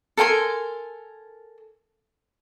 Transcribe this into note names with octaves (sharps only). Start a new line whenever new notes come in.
A4 A#4 G#5 C6